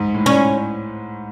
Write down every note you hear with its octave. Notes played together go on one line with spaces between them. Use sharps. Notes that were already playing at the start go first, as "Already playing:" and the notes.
Already playing: G#2
A2
C#4